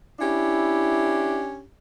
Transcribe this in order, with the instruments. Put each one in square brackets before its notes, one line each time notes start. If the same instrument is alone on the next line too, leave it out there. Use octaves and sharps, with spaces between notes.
[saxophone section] C#4 D4 G4 [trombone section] E4